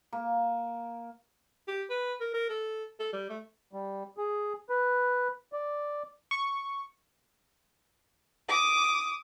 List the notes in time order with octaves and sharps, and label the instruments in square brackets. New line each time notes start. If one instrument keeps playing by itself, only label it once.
[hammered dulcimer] A#3
[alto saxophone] G4
B4
A#4
A#4
A4
A4
G3
A3
[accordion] G3
G#4
B4
D5
[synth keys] C#6
[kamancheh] D6 D#6